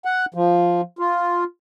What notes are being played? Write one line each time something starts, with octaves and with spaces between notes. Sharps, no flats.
F#5
F3
F4